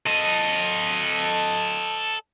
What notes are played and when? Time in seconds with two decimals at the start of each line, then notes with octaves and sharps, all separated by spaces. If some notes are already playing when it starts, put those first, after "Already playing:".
0.07 A4 D#5